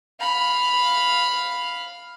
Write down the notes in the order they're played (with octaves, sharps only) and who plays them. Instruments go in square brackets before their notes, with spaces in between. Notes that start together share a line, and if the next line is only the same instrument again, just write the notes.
[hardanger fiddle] F5 B5